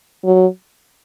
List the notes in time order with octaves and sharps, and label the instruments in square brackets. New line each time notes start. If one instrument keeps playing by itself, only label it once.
[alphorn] F#3